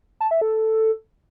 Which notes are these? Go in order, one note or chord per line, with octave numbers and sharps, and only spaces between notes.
A5
E5
A4